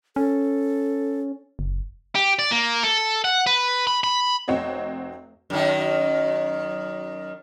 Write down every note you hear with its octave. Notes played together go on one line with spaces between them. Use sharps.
C#4 A4
F#1
G4
D5
A#3
A4
F#5
B4
B5
B5
F1 C4 F#4 C#5 D#5
F#2 D#3